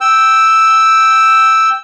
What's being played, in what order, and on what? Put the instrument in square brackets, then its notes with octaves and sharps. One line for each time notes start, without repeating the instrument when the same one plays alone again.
[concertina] G5 E6